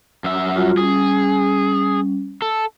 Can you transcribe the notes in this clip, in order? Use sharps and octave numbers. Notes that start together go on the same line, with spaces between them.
F#2 E5
G3 F4 F#4
G3 C#4 G#4
A4